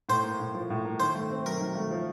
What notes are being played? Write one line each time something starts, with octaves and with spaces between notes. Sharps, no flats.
A2 C5
A#3
A2
F3
A2
A#3
D#3 C5
A3
C4
F#3 A#4
D#3
A3
F3